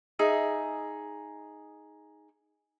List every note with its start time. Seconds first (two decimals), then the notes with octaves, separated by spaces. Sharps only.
0.19 D#4 G#4 E5